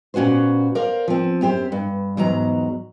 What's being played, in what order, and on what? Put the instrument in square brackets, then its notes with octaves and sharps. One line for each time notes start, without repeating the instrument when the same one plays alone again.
[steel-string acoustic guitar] A#2 C#4 F#4 B4 C5
A#4 C5 D5 F5
F3 C4
F#2 C4 G4 C5
G2
E2 G#2 F#3 A#5